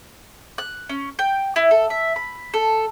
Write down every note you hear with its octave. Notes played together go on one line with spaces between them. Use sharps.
F#6
C#4
G5
E4
A4
E5
B5
A4